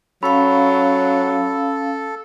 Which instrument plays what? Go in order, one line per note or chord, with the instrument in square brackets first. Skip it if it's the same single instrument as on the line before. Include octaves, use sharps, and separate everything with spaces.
[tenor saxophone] F#3 [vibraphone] C#4 F5 [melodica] A4 [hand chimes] B5